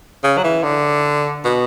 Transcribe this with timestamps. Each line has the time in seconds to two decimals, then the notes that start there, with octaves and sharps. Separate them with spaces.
0.23 C#3
0.38 F#3
0.44 E3
0.63 D3
1.45 B2